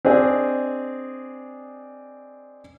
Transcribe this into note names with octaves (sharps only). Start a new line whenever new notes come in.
C4 D4 G#4 D#5